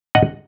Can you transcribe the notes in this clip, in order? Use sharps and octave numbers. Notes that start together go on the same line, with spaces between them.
D#5 F#5